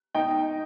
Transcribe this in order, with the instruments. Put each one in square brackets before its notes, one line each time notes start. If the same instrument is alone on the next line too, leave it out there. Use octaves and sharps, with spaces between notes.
[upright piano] D#4 G5